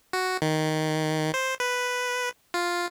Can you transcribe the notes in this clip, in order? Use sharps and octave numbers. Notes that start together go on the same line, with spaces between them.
F#4
D#3
C5
B4
F4